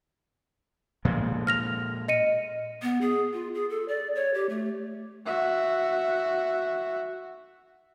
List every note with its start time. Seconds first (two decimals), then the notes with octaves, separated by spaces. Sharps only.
1.05 A#2 F3 G#3
1.47 F6 A#6 F7
2.08 D#5 C#7 D#7
2.82 B3
3.01 G#4
3.33 F4
3.54 G#4
3.70 A4
3.88 D5
4.15 C#5
4.34 G4
4.49 A3
5.26 F#4 E5